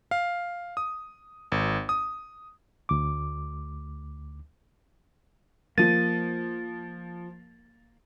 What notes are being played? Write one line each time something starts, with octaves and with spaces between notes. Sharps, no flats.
F5
D#6
G#1
D#6
D2 D6
F3 A#3 A6 D#7